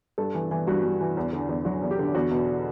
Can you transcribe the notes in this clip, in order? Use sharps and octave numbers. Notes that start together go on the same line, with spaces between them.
G2 A4
E3
E3
G2 F#4
G2
E3
E2
D3
E2
F#3 F#4
E2
G4
D3
E2 F#4
B2